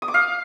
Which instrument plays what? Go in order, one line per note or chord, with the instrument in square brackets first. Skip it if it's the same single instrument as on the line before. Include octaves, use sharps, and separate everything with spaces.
[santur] D#6
D6
F5